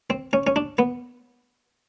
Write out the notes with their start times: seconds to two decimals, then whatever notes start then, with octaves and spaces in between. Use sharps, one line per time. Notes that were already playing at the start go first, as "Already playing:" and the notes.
0.10 C4
0.33 C#4
0.47 C#4
0.56 D4
0.79 B3